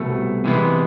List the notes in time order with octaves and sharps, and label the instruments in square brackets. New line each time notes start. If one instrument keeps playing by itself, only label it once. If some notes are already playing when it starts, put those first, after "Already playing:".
Already playing: [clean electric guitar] C2 B2 A3
C3 E3 G#3 B3